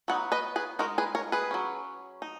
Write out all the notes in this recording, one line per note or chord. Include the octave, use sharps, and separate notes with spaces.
F#3 B3 D#4 F#5
B4 D#5
G#4 B4
G#3 D#4 F#4 A#4
G#4 B4
A#4 C#5
G#4 B4
F#3 C#4
D#4